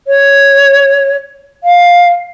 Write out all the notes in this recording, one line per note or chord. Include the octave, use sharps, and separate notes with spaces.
C#5
F5